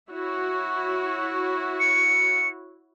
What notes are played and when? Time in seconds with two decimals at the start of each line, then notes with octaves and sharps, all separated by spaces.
0.12 E4 F#4 C#5
1.80 C#7